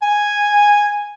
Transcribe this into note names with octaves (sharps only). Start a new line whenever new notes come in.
G#5